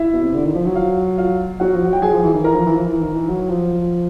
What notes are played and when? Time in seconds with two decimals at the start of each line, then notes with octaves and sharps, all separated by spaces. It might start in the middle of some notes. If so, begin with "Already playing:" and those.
Already playing: E4 E5
0.13 B2
0.23 C3
0.34 D3
0.45 D#3
0.55 F3
0.65 F#3
0.76 F4 F5
1.18 F4 F5
1.60 F#3 F#4 F#5
1.74 F3
1.88 F#3 G5
2.02 F#3 G#4 G#5
2.13 F3
2.23 E3
2.34 D#3
2.44 E3 A#4 A#5
2.55 F3
2.66 E3
2.76 F3
2.87 E3
3.01 D#3
3.15 E3
3.29 F#3
3.50 F3